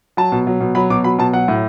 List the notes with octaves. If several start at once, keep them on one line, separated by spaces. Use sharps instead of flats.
F#3 A5
B2
F#3
B2
F#3 B5
B2 D6
F#3 B5
B2 A5
F#3 F#5
A2